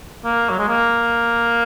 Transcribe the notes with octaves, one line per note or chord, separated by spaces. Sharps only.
A#3
F#3
G#3
A#3